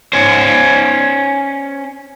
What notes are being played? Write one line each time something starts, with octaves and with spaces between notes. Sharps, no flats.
C#4 C5